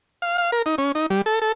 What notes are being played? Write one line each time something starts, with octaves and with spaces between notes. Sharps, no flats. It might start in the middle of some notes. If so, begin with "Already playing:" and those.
F5
F5
A#4
D#4
C#4
D#4
G3
A4
A4